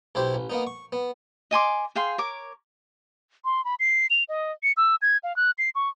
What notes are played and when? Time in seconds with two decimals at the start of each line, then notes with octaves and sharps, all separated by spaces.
0.15 B1 E4 G4 C5
0.34 A1
0.50 A#3 B3 D#4
0.67 C#6
0.92 B3
1.51 D#5 G#5 C6 D6
1.95 G#4 F5 G5 C6
2.18 A#4 C#5 D6
3.45 C6
3.65 B5
3.80 C7
4.10 F7
4.29 D#5
4.63 C#7
4.77 E6
5.02 G#6
5.23 F5
5.36 F#6
5.58 C7
5.75 C#6